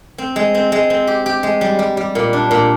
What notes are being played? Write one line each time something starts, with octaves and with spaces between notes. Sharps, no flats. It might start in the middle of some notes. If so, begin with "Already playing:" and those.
C4
G#3
C4
G#3
C4
G4
G4
G#3
G3
G3
G3
A#2
D4
A#2